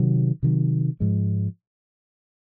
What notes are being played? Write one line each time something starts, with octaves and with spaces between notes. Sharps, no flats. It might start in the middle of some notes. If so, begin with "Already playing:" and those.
Already playing: C3 D#3 F#3
C3 D#3 F#3
G#2 F3 G#3